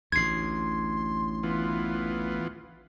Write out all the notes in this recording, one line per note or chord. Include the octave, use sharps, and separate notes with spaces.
A1 D2 C6 G#6 C7
E3 B3 F4